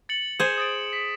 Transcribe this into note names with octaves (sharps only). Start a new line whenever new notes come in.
A6 C#7 F#7
G#4 C5 E7
D#6 A6 D7
B6